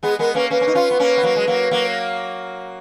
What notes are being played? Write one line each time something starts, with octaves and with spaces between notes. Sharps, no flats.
G#3 B3 G#4
G#3 B3 A#4
A#3 C#4 B4
A#3 C#4 B4
C#4
D#4
C#4 F4
B3
A#3 C#4
B3
F#3 A#3
G#3
F#3 A#3
F#3 A#3